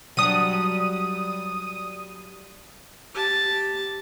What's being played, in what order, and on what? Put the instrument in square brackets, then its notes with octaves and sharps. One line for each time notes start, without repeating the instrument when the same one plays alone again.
[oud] F#3 G3 D4 [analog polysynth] D#6 D#7
[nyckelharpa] G4 A5